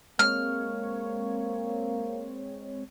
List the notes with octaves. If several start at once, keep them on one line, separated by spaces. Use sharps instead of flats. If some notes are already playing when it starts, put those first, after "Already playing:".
G#3 A#3 C4 C#5 F6